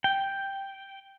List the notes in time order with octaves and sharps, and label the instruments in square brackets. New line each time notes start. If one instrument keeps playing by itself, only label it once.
[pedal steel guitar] G5